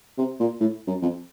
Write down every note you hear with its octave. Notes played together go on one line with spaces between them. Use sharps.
C3
A#2
A2
F#2
F2